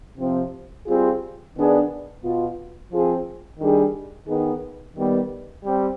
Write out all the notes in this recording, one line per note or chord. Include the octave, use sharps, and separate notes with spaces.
C3 F3 C4
G3 C4 F4 G#4
D#3 B3 D4 G#4
B2 B3 F4
F3 C4 F4 G#4
D#3 G3 D4 G#4
D#3 B3 D#4 G#4
D#3 G3 B3
G3 C4